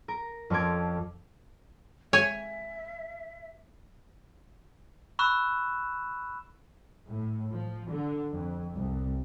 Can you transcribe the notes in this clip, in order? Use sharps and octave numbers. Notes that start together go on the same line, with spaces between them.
A#4
F2 C#4 A4 C6 D6 G#6
C#5 E5 G#5
B5 C#6 E6 F#6 E7
A2
F3
D3
F2
C2